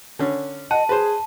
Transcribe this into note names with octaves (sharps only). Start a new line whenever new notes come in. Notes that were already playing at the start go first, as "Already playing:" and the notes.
D3 C#4
D#5 F#5 A5
G#4 B4 C5